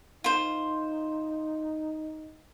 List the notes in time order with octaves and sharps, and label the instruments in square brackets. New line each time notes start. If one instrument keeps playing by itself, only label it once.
[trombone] D#4 [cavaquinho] F4 C5